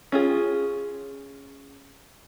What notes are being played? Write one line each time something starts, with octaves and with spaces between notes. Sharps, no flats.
C#4 F4 G#4